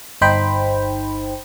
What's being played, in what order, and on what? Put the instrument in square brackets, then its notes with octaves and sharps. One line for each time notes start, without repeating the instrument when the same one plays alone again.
[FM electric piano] G1 D#4 C5 G5 B5